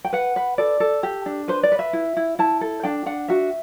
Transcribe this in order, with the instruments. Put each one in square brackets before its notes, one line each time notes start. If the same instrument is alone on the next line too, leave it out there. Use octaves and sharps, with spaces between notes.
[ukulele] G5
B4 F#5
B4
A4 D5
A4
G4
D4
B4 C5
D5
B4
E5
E4
E4
E4 A5
A4
D4 G5
D4 F#5
F#4 E5